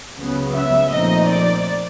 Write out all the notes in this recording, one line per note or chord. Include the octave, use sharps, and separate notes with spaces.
C#2 C#3 F#3 B3
E5
A#2 F3 A3 C4 D#4 D#5
D5